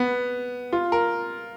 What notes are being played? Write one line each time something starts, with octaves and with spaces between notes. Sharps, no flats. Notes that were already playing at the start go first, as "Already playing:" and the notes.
Already playing: B3
F4
A#4